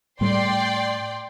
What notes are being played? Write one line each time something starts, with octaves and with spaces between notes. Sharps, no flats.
A2 G3 A3 D5 G5 C6